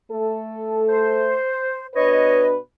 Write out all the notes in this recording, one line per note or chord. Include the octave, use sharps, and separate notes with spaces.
A3 A4
C5
B2 D4 B4 C#5 D#5